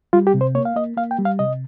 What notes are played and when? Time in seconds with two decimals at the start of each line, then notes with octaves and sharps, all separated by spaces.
0.13 G3 F4
0.27 G4
0.34 C3
0.41 C5
0.55 A#3 C#5
0.65 F5
0.76 A#3 D#5
0.97 A#3 F5
1.11 G5
1.19 G3
1.25 F5
1.39 C3 D#5